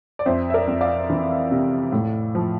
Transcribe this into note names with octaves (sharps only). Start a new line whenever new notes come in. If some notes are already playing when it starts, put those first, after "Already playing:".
D5
F2 C5 E5
E5
A#4 D5
F2
D5 F5
E3
C3
A2
F3